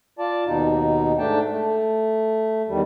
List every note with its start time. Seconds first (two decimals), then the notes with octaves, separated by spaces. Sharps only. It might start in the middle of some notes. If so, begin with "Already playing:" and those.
0.19 F4 D5 A5
0.46 D#2 B2 D#4
1.18 G#2 A3 D4 G5 A5
1.51 A3
2.68 E2 D#3 G3